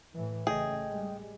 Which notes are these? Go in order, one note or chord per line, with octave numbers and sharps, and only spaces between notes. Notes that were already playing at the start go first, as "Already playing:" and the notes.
A2 E3
A1 C#3 A3 G#4 D#5 G5
G3 G#3